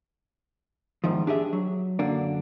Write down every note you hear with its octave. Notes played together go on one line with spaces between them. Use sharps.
E2 G#2 D#3 F3
D4 G4 G#4 E5
F#3
F#2 D3 A#3 D4